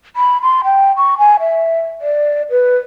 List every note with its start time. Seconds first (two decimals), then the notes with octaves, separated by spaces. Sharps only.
0.16 B5
0.42 C6
0.64 G5
0.97 C#6
1.18 G#5
1.40 E5
2.01 D5
2.50 B4